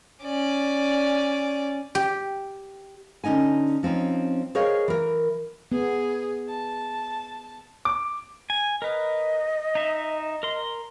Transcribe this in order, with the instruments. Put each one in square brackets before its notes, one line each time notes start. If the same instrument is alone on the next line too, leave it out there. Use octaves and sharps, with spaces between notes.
[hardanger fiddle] C#4 D5
[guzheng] G4
[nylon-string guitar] D3 C#4 D#4 D#5 G#5
F3 C4 C#4 D#4
G#4 A#4 C5 C#5 D#5 F5
E3 A#4
[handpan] B3 [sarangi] G#4
[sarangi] A5
[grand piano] D6
[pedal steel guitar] G#5
[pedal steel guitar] A#4 B4 [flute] D#5
[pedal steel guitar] D#4 E5
A#4 C6